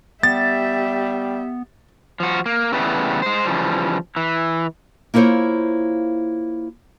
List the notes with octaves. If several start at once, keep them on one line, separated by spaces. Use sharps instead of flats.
G3 B3 G4 E5 A6
F3 F#4
A#3
C#3 E3 G3 A3 B3
G#3 C5
C#3 E3 F3 G3
E3
A#3 E4 F4 C5 C#5